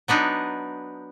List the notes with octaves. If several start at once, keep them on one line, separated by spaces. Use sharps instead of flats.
F#3 B3 D4 D#4